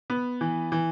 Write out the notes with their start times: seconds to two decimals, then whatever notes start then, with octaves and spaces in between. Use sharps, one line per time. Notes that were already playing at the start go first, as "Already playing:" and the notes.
0.10 B3
0.41 E3
0.72 E3